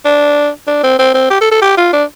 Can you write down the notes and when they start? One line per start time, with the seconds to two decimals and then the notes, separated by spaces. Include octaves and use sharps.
0.05 D4
0.67 D4
0.83 C4
0.99 C4
1.14 C4
1.30 G4
1.41 A4
1.51 A4
1.62 G4
1.77 F4
1.93 D4